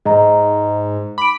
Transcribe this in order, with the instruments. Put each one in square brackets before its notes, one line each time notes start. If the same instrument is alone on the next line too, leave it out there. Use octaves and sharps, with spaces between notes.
[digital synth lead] G#2 [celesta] D#5 A#5
[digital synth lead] B5 [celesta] D6 D7